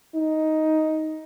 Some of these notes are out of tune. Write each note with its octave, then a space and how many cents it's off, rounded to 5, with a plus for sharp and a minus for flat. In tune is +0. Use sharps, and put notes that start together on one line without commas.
D#4 +10